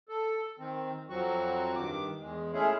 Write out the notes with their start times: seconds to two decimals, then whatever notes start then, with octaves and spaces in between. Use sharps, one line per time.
0.09 A4
0.59 D#3 C4
1.10 F2 F3 F#3 C4 F#4 C#6
1.76 G2 D#3 D6
2.20 E2 G#3
2.53 G#3 A3 C#4 E4 G#4